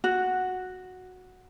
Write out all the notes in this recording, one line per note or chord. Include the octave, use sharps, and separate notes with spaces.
F#4